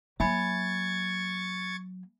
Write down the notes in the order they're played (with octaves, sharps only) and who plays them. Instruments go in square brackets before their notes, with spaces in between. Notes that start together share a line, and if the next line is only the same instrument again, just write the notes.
[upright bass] F#3 A#3 [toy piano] E5 G#5 B5 [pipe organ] C#6 G#6 A6